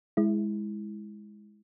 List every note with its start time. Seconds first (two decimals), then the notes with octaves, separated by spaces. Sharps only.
0.17 G#3 E4